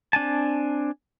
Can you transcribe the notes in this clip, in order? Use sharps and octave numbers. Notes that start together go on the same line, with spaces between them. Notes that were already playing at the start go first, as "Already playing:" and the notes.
C4 D4 G#5 A5